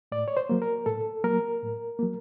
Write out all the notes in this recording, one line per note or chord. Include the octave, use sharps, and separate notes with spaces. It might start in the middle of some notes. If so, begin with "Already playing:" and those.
A2 D5
C#5
C5
F#3 A#3
A#4
A2 A4
F#3 A#3 A#4
A2
F#3 A#3